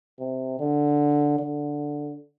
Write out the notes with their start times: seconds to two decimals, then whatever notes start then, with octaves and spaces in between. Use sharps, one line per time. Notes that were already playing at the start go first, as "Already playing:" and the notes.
0.20 C3
0.59 D3
1.38 D3